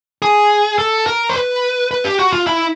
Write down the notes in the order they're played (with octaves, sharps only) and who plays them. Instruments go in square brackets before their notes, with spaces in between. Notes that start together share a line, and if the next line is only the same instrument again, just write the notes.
[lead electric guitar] G#4
A4
A#4
C5
B4
B4
G4
F#4
F4
E4